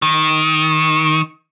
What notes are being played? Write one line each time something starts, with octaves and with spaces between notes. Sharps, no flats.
D#3